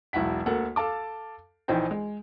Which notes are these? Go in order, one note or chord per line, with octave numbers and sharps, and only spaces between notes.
E1 B1 E4 F#5 B6
D2 A#3 A4 F#5
A4 F5 A5 D6
A#1 E3 D#4 C5 G5
G#3